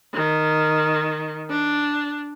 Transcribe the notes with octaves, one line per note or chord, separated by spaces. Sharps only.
D#3
D4